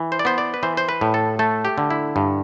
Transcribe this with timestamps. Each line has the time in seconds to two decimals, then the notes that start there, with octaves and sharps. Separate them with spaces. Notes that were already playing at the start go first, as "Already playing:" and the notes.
Already playing: E3
0.12 C5
0.19 D5
0.25 B3 C5
0.38 D5
0.54 B4
0.63 E3 C5
0.77 C5
0.89 B4
1.01 A2
1.14 A4
1.39 A3 A4
1.65 G4
1.78 D3
1.90 E4
2.16 G2